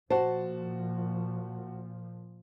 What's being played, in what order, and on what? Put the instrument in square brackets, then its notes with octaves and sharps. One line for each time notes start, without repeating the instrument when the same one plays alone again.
[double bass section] A#2 F3 [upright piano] F#4 A5 [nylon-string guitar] C5